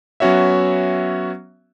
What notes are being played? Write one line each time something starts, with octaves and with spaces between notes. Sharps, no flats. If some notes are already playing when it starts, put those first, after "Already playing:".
F#3 B3 C#4 F#4 C#5 E5